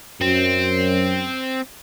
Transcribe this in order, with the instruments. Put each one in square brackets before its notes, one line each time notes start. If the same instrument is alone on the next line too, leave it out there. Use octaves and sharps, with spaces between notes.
[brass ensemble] F#2 [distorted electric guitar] C4